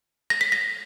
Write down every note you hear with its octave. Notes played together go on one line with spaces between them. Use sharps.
A#6
B6
A#6